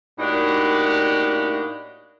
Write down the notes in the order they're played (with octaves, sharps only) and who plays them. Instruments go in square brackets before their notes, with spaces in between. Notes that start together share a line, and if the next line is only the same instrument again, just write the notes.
[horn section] A2 A#3 D4 D#4 F#4 G4